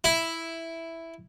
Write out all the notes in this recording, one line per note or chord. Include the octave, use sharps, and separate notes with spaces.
E4